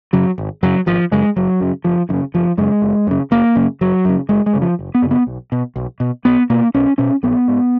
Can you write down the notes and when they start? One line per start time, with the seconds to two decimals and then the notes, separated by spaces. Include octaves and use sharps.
0.13 F#2 C#3 F#3
0.38 G#1
0.63 F#2 C#3 F#3
0.86 G#1 F3
1.12 F#2 C#3 G#3
1.36 F#1 F#3
1.61 F#2 C#3
1.84 F#1 F3
2.09 F#2 D#3
2.13 C#3
2.34 F#1 F3
2.58 F#2 C#3 G#3
2.82 F#1
3.07 F#2 C#3
3.31 F#1 A#3
3.56 F#2 C#3
3.81 F#1 F#3
4.05 F#2 C#3
4.29 F#1 G#3
4.46 G#3
4.53 F#2 C#3
4.62 F3
4.79 F#1
4.95 B3
5.02 F#2 C#3
5.11 B3
5.27 B1
5.52 B2
5.76 B1
6.00 B2
6.25 B1 B3
6.50 B2 A#3
6.74 B1 C#4
6.98 B2 C#4
7.23 A#1 B3
7.48 G#2